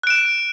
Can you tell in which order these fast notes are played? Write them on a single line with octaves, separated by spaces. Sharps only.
F#6 D7 E7